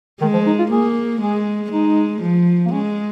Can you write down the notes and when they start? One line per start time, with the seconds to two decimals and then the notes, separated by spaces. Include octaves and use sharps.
0.21 D#3 G#3
0.34 F3
0.47 D#4
0.59 F4
0.71 A#3 G#4
1.21 G#3 G#4
1.71 G#3 D#4
2.22 F3
2.66 A#3
2.72 G#3 C#4